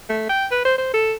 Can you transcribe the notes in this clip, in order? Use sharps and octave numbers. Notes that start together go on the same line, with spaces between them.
A3
G5
B4
C5
C5
A4